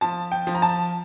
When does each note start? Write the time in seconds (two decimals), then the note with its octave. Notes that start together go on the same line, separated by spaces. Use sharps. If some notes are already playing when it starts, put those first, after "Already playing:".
0.01 F3 A5
0.32 G5
0.47 F3
0.55 A#5
0.62 A5